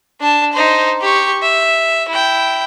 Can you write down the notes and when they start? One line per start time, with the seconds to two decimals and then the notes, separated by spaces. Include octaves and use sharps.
0.21 D4 A5
0.52 D#4 C5
1.01 G4 C#6
1.43 E5
2.09 E4 G5